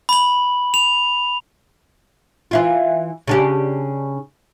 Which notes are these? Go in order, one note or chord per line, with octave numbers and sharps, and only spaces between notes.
B5 F#7
F7
E3 E4 F4
C#3 D4 G4